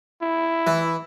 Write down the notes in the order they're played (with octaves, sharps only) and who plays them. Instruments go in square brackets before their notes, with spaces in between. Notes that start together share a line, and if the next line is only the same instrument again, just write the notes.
[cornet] E4
[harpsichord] E3